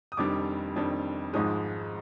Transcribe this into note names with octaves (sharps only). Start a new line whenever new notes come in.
D#6
F1 F2 D#3 G3 D4 D6
F1 F2 D#3 G3 D4
G#1 G#2 F3 G#3 D#6